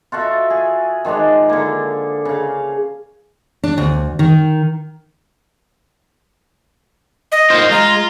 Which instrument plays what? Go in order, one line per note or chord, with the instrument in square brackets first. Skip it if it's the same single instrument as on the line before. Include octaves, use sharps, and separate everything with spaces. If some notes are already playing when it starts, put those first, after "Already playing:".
[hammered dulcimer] F4 F#4 A4 E5
G#4
D#3 F3 G#3 D4
D3 A#3
C#3 F5
[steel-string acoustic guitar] D4
D2
D#3
[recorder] D#5
[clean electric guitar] A#3 D#4 C5 [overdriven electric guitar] F4
[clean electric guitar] G#3 [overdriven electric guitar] F4 [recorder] A#5